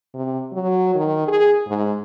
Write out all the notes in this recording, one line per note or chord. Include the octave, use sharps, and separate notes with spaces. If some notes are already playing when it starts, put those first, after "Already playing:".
C3
F#3
D#3
G#4
G#2